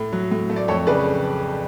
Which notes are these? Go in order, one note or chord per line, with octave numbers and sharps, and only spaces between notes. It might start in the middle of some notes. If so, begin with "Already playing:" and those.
Already playing: A2
F#3
A2
A3
D5
F2 A4 C#5
C#3 B4 D5